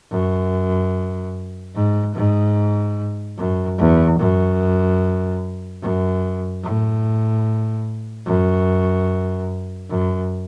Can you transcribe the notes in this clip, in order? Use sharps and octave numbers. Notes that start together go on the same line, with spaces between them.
F#2
G#2
G#2
F#2
E2
F#2
F#2
A2
F#2
F#2